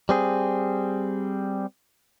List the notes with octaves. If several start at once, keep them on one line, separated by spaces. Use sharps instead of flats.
G3 C4 G#4